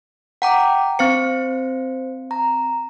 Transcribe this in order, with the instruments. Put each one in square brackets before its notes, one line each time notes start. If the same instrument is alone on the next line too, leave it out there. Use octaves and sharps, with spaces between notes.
[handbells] F#5 A#5 [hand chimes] G5 D6
[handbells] C4 F5 C#7 [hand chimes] C5
[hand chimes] A#5